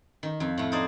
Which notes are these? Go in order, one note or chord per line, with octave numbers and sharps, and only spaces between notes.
D#3
F2
A2 A3
D#4 G#4 C5 D5 D#5